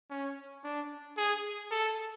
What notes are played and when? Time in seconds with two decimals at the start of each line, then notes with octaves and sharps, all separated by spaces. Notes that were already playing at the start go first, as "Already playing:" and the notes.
0.10 C#4
0.64 D4
1.18 G#4
1.71 A4